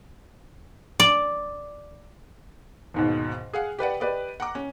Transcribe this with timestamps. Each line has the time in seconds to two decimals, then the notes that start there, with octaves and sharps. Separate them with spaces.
1.00 D5
2.94 D#2 G#2 B2
3.53 G#4 F5 F#5
3.79 G4 B4 D5 F#5
4.00 G4 B4 D5 D#5
4.40 F#5 A#5 D6
4.55 C#4